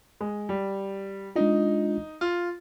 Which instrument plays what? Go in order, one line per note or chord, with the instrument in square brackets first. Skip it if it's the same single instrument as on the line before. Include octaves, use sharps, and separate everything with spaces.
[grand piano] G#3
G3
[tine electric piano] G#3 D4 F4 [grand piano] D#4
[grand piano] F4